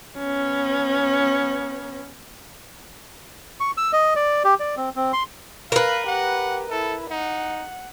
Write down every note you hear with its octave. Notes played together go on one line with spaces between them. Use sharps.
B3 C#4
C#6
E6
D#5
D5
G4
D5
C4
C4
C6
A#4 B4 F5
G4 F#5
E4 A4
D#4 F#5